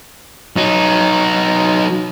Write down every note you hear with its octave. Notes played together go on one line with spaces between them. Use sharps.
F#3 D#4